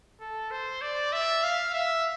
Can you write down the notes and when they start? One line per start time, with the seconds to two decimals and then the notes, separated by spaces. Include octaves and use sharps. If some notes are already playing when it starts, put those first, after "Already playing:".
0.20 A4
0.51 C5
0.82 D5
1.13 E5
1.44 F5
1.74 E5